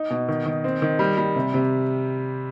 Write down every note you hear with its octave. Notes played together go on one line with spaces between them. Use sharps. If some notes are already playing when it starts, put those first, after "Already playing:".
Already playing: D#4
B2
D#3
D#3
C4
D#3
G3
G3
C3
C3